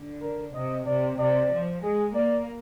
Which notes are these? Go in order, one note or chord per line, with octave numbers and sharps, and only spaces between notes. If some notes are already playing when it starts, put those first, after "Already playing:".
Already playing: D3
A#4
C3 D#5
C3 D5
C3 D5
F3
G#3 G#4
A#3 D5